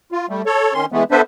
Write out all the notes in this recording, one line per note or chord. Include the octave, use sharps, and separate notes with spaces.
F4
G3 A3
A4 C#5
D#3 C#4 C6
E3 G#3 A3 B3
B3 D4 A4 B4 C5 E5